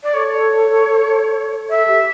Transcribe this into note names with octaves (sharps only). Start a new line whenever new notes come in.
D5
A4 C#5
A4 E5
G4